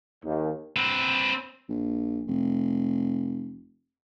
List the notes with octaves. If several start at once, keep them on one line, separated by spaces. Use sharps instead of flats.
D#2
C4 B4
A#1
F1